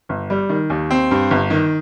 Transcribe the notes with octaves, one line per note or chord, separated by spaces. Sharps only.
G1
G3
D#3
D#2
C4
G2
G1
D#3